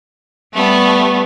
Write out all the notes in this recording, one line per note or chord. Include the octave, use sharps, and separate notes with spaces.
G3 A3 B3